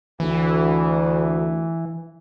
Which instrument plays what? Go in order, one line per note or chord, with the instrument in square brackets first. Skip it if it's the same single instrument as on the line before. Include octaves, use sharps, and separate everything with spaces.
[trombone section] D2 [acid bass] E3